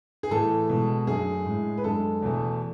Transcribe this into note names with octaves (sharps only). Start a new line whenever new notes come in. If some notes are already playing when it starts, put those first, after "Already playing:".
G#4
A2 E3 A3 A4
B2 G#3
F#2 D3 A3 G#4
A2 G#3
B4
F#2 D3 G#3 A4
E2 B2 A3